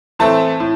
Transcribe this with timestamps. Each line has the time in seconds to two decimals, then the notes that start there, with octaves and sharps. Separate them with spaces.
0.19 A2 E3 A3 C4 A5
0.60 A2